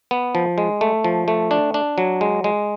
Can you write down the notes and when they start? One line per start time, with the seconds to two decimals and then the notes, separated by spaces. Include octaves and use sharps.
0.11 B3
0.35 F3
0.58 G#3
0.81 A3
1.04 F3
1.28 A3
1.51 D4
1.74 D4
1.98 F#3
2.21 G#3
2.44 G#3